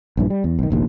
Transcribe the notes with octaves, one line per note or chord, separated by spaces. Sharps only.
A#1 G2 E3
G3
E2
B1 D#3
F1 A#1 D#2 A#3